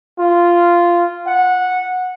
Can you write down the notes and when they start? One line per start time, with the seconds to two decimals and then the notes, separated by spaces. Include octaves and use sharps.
0.19 F4
1.27 F#5